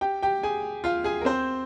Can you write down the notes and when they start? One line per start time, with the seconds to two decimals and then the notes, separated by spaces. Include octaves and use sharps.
0.01 G4 G5
0.22 G4 G5
0.43 G#4 G#5
0.84 F4 F5
1.04 G#4 G#5
1.21 A#4
1.25 C4 C5